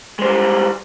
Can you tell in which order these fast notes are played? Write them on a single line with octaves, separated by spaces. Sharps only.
G#3 C5 G3